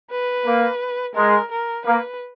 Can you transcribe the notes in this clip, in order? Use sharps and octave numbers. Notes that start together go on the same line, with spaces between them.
B4
A#3
G#3 A#4
A#4
A#3 B4